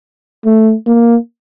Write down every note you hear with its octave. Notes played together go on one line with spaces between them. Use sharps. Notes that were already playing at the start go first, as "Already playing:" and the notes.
A3
A#3